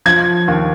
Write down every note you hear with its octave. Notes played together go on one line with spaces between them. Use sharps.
F3 G#6
D#2